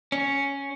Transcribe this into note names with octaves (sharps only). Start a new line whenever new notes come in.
C#4